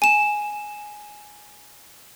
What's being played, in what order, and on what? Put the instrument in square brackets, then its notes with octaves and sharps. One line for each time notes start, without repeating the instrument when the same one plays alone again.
[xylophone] G#5 E7